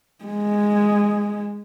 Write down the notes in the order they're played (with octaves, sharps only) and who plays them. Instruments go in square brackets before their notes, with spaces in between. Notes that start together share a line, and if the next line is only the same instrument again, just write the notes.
[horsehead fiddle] G#3